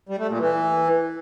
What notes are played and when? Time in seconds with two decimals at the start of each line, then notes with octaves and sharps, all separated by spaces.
0.09 G3
0.19 A3
0.29 A#2
0.39 E3